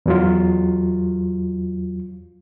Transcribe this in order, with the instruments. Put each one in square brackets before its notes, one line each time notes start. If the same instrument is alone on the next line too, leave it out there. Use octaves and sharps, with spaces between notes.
[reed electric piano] E2 F#3 F4